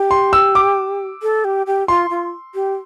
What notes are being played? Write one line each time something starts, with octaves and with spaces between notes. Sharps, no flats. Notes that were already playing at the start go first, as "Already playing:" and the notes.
Already playing: G4
C6
E6
D6
A4
G4
G4
F4 C6
F4
G4